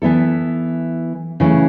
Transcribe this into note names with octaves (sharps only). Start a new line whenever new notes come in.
E3 B3 E4 A4
C#3 E3 A3